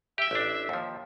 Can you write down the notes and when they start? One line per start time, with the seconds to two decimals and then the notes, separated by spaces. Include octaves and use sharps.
0.18 G4 E5 G5
0.31 A1 D4
0.69 D#2 F3